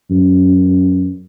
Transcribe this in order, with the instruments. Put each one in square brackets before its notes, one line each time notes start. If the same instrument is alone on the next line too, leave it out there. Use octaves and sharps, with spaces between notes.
[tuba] F#2